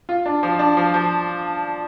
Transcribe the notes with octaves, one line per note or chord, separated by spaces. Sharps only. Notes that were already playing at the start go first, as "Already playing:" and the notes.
F4
D4
F3
D4
F3
F3